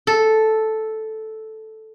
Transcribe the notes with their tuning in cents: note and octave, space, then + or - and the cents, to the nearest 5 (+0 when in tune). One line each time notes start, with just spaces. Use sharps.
A4 -5